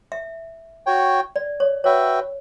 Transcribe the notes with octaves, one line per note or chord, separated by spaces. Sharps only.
E5
F#4 C#5 G5
D5
C#5
F#4 B4 C#5 E5 G5